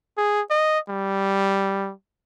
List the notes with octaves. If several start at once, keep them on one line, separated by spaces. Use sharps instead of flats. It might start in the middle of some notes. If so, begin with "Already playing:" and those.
G#4
D#5
G3